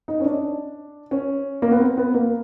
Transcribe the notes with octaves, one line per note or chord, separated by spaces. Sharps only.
D#4
C#4
D4
C#4
A#3
B3
C4
B3
A#3